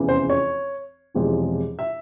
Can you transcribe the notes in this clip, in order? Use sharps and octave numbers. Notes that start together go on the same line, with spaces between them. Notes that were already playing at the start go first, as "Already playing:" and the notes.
Already playing: F1 E2 C#3 E3
C5
C#5
E1 E2 C3 F3 G#3
E5